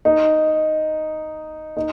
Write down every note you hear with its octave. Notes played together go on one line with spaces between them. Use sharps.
D#4
D#4